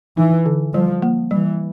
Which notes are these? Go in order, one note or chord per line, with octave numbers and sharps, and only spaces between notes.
E3 D#4
D3
F3 G3
A#3
E3 G3